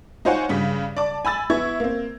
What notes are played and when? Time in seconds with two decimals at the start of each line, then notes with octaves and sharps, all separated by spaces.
0.25 D#4 F4 C5 C#5 F#5 G#5
0.49 G2 C#3 B6
0.97 D5 A5 D6
1.25 G#5 B5 E6 A6
1.50 B3 E4 C#6 G#6
1.80 A#3 C4